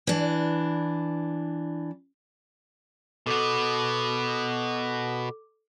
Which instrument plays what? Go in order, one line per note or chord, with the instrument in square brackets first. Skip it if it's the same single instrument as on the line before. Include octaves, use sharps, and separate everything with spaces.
[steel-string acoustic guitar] E3 D4
[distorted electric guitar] B2 B3 [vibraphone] A4 D6